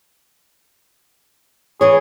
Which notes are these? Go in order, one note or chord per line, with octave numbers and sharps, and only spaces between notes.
E3 G#4 C#5